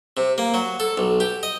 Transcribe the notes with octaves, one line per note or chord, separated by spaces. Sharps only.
C3
A#3
F#3
A4
B1
G4
D#5